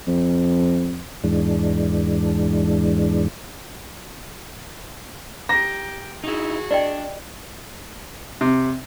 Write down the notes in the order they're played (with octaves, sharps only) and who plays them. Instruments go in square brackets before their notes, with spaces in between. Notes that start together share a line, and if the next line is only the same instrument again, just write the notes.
[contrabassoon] F2
[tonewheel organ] E2 G#2 E3 G#3 D4
[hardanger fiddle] G4 [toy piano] A#5 [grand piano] A#6
[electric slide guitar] D#4 E4 [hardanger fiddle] F#4 G#4
[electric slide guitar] D4 [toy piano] D5 D#5 G5
[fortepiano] C3